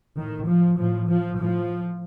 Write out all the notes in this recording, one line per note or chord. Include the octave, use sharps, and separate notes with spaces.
A2 D#3
F3
A2 F3
F3
A2 F3